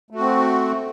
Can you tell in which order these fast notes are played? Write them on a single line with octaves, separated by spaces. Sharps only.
A3 F#4 C4